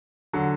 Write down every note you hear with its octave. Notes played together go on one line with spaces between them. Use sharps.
D3 F#3